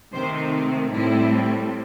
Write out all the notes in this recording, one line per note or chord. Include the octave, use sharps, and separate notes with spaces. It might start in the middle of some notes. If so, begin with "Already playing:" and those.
C3 D#3 A3 C4 C5
A2 G3 C4 E4